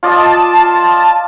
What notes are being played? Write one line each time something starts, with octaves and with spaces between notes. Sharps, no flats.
F4 D5 D#5 A5